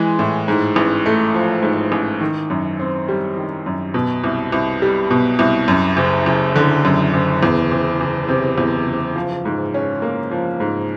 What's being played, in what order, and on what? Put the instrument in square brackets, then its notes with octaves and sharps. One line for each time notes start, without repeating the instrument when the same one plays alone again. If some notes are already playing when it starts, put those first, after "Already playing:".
Already playing: [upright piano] E3 G#3
A2
G#2
A1
A3
F3
G#2
A1
D#3
F#2
C4
G3
D#3
F#2
B2
C2
C2
G3
B2
C2
F#2
F#1
F#1
D3
F#2
F#1
E2
F#1
F#1
C3
E2
F#1
F3
G#2
C#4
A#3
F3
G#2